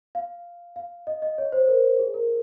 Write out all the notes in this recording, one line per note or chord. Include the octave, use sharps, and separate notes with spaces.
F5
F5
D#5
D#5
C#5
C5
A#4
G#4
A#4